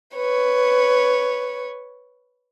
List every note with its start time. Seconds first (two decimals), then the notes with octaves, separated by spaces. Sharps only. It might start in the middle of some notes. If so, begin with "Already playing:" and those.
0.15 B4 C#5